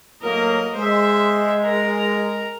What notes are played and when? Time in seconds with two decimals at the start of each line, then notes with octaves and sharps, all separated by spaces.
0.22 A2 F#3 A#3 A#4 D#5
0.75 G#3 C5 E5
1.65 A#4 A#5